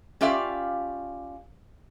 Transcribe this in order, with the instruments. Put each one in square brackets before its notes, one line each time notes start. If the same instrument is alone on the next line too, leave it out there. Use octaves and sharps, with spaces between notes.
[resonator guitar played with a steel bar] C#4 F4 G4 D5 E5 F5